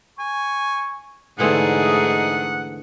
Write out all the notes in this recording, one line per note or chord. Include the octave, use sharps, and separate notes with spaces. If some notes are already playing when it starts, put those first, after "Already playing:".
G#5 C#6
G#2 D3 E3 A3 C4 D#4 G#4 F#5